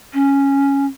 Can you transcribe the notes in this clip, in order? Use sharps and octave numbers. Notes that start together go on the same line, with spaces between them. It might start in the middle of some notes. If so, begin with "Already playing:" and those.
C#4